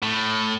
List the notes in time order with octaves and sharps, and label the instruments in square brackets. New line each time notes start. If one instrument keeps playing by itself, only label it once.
[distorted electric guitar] A2